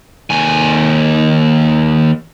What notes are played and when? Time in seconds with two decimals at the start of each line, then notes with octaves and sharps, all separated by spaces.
0.30 D#2 G#5